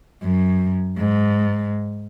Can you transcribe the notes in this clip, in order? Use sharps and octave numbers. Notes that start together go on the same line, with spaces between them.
F#2
G#2